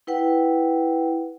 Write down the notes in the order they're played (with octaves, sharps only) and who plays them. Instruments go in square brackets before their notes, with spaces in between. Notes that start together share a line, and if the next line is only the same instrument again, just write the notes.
[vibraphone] E4 B4 F#5 G5